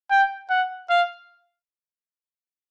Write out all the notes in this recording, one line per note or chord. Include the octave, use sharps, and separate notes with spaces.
G5
F#5
F5